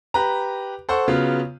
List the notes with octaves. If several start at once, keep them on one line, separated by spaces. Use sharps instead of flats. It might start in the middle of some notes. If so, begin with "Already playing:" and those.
G4 B4 A#5
A4 C5 F#5 C#6
C#3 F#3 B3 F4